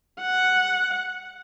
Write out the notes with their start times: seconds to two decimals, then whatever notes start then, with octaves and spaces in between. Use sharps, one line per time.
0.21 F#5